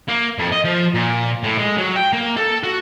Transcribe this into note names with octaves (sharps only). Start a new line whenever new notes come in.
A#3
F2
D#5
F3
A#2
A2
G#3
F#3
G5
A#3
A4
F#4